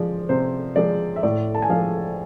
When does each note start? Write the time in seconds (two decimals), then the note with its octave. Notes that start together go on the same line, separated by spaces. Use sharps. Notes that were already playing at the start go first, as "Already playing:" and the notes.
Already playing: F3 G#3 D5
0.29 C3 C5
0.76 F3 G#3 D5
1.16 E5
1.23 A2 D5
1.55 A5
1.62 G#5
1.70 F3 G#3 F5